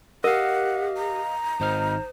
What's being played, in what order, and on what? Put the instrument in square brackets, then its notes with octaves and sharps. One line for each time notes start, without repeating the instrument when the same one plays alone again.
[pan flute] G4 [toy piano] A#4 [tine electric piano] D#5 F5 [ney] F#5
[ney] A#5
[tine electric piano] G#1 D#4 F6 [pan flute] C5